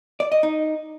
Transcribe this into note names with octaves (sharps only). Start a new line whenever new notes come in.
D5
D#5
D#4